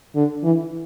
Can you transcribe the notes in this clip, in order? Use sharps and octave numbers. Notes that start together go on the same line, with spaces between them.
D3
E3